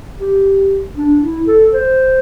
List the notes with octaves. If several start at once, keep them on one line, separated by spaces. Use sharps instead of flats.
G4
D4
E4
A4
C5